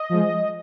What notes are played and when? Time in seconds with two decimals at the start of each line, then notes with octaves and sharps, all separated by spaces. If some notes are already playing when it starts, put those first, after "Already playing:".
Already playing: D#5
0.09 F3 G#3